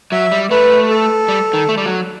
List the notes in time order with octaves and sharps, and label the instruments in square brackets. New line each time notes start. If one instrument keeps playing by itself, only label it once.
[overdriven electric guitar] F#3 [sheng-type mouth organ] E5
[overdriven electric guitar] G3
[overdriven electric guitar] A3 [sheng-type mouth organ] B4
[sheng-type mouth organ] A4
[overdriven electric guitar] G3
D#3
A3
G3
F#3